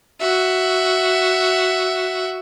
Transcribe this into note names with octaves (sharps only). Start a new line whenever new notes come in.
F#4 E5